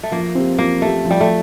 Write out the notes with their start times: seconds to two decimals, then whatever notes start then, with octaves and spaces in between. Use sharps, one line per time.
0.03 A3
0.12 F3 A#3
0.35 C4 G4
0.58 F3 A#3
0.81 A3 C4 G4
1.05 F3
1.11 G3
1.21 A3